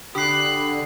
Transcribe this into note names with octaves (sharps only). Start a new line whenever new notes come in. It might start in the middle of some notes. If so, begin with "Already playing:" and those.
D3 G4 B5 D#6 F#6 C7